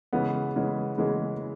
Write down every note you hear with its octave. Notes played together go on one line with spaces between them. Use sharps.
C#3 E3 G#3 B3
C#3 E3 G#3 B3
C#3 E3 G#3 B3